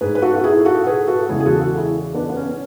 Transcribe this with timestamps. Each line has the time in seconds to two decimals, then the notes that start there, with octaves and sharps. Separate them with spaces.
0.01 G#2 G#3 G#4 B4
0.15 B4
0.22 F#4 A4
0.36 F#4
0.44 E4 G#4
0.65 F#4 A4
0.87 G#4 B4
1.07 F#4 A4
1.29 E2 C#3 G#3 E4 G#4
1.40 G#4
1.46 F#4 A4
1.61 F#4 A4
1.77 E4 G#4
2.15 B3 D4
2.29 B3
2.36 C#4
2.51 C#4